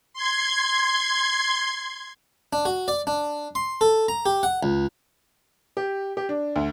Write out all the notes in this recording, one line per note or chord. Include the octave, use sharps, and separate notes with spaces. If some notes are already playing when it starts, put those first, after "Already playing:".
C6 G#6
D4
F#4
D5
D4
C6
A4
A#5
G4
F#5
C#2
G4
G4
D4
D2